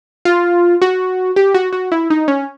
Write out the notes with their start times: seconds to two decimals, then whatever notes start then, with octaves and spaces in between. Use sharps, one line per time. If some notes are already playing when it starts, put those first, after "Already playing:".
0.25 F4
0.82 F#4
1.36 G4
1.54 F#4
1.73 F#4
1.92 E4
2.10 D#4
2.28 C#4